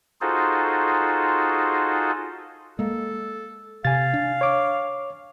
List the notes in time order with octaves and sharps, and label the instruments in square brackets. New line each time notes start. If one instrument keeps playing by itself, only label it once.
[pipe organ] D#4 F4 F#4 G#4 A4 C5
[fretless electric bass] G#3 A#3 [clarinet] A4
[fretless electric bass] C3 [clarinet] F5 [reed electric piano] G#5 A6
[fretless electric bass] D4
[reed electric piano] C#5 D6